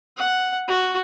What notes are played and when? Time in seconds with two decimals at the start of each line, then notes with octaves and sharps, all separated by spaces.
0.17 F#5
0.68 F#4